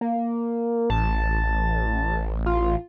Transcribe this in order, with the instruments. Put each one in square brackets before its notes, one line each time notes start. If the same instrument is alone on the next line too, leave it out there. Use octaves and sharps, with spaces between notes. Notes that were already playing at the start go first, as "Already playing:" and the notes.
[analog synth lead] A#3
[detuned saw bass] A1 [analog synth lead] A5
[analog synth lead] F4